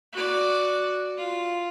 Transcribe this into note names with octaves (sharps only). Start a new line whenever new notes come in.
F#4 D5
F4